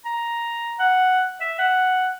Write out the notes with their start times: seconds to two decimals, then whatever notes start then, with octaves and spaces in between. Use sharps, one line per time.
0.05 A#5
0.79 F#5
1.41 E5
1.59 F#5